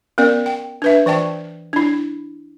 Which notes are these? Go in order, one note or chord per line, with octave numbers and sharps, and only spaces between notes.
B3 C#4 A#4 D5
G5
D4 B4 E5
E3 D5 G5 A5
D4 E4